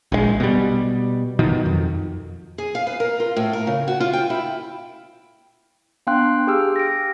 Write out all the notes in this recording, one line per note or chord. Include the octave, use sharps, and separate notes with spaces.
A#1 D3 G#3
B2 G3
B2 D#3 F#3
F2
G#4
F5
B4
A#4
F4
A2
A#4
C#3
F#4
F4
G5
E4
B3 D4 F5 G5 C6 F#6
G4 G#4 G5 E6 F6
A#6 D7